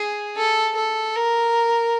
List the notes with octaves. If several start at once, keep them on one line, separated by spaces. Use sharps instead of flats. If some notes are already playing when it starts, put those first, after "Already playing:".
Already playing: G#4
A4
A4
A#4